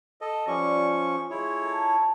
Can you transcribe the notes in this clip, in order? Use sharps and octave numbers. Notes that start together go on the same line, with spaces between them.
A4 D#5
F3 G3 C#4 C#6 D#6
F4
G#3 E4 G#4 C#5
A4 A5 A#5